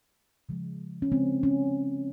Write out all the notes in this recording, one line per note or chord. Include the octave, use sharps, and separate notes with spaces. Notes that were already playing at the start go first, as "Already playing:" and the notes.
C#3 F3 G#3
C#4
C#3 F3 G#3 C4
C#4